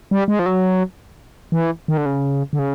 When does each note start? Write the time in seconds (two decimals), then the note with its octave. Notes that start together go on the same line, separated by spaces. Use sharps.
0.11 G3
0.28 G#3
0.39 F3
0.46 F#3
1.52 E3
1.88 D#3
1.97 D3
2.06 C#3
2.53 D3
2.59 C#3